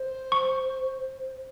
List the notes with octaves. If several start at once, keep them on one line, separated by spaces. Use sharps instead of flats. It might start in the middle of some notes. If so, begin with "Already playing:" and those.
Already playing: C5
C#6